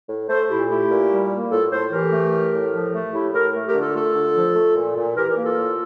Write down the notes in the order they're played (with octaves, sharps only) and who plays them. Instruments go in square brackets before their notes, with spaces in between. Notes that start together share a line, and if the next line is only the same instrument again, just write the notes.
[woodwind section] A2
A3 A4 C5
A#2 E4 G4
A3 E4 G4
A#2
G3
A#3
A2 F4 A4
A2 A4 C5
E3 G4 A#4
A3
A2
A2
F3
A3
A2 E4 G4
A2 G4 A#4
A3
G4 A#4
D3
F4 A4
A3 F4 A4
D3
F3
A3
A#2
A#2
E3 G4 A#4
G4 A#4
A#3
F4 A4
A2